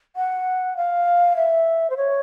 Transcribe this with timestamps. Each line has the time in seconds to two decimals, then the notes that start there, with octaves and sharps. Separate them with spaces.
0.16 F#5
0.77 F5
1.36 E5
1.90 C5
1.97 C#5